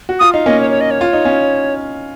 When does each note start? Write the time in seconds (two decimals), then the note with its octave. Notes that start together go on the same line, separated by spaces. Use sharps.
0.09 F#4
0.19 F4 D#6
0.32 D#4 F5
0.46 A#3 C#4 D#5
0.60 C#5
0.70 C#5
0.81 D#5
0.91 C#5
1.01 F4
1.13 D#4
1.25 C#4 F4